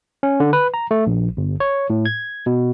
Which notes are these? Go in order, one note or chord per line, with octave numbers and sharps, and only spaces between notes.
C#4
D3
B4
A#5
A3
A#1
G1
C#5
A2
G#6
B2